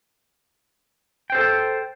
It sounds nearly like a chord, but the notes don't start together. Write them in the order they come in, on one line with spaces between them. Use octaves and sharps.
G5 C5 A4